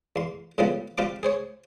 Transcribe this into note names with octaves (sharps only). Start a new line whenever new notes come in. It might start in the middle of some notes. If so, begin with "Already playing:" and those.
E2 C6
A2 C#3 F3 G3 B3
G3 C4 F4 A#5 D6
G#4 C5 C#5